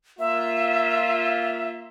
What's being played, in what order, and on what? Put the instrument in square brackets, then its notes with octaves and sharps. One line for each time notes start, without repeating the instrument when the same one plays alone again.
[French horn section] A#3 F4 [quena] E5